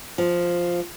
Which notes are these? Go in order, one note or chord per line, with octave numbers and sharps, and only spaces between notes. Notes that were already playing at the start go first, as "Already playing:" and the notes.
F3